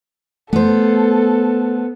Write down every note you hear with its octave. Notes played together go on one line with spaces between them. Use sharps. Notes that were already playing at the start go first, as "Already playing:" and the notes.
A3 B3 A4 C5